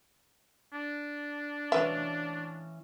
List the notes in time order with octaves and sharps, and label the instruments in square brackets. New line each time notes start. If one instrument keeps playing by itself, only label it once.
[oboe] D4
[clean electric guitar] E3 C#4 F5 [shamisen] F#3 B4 E5